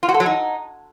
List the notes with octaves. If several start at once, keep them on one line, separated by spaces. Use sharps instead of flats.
F4
F#4
A4
F#3
D#4